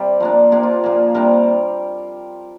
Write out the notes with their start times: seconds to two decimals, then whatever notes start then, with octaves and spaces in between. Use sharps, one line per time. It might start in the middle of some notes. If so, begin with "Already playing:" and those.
Already playing: C3 G3 G4 D5
0.20 F3 A#3 D4 A#4
0.52 C3 A#3 D4 G4
0.63 F4
0.84 A#2 F3 A#3
1.14 C3 G3 A#3 D4 A#4